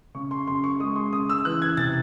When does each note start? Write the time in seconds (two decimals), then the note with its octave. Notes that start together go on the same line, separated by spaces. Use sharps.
0.14 C#3 C#6
0.31 C6
0.47 F#2 C6
0.64 C#6
0.80 G#3 D#6
0.96 C6
1.12 C#3 D#6
1.30 E6
1.45 E3 F#6
1.62 G#6
1.77 C3 A6